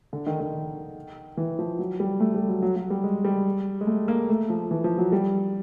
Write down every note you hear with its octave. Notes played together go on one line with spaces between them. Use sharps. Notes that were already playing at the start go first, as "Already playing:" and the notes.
D3
D#3
D#3
E3
F3
F#3
G3
A3
G3
F#3
F#3
F#3
G3
G#3
G3
G#3
A3
A#3
A3
F3
E3
F3
F#3
G3